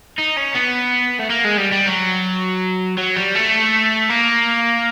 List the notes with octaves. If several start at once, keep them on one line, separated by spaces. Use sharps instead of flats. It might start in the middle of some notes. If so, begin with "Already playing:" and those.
D#4
C#4
B3
A3
A#3
G#3
G3
G3
F#3
F#3
G3
A3
A#3